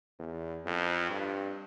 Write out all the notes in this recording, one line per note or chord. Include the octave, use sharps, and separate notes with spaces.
E2
F2
G2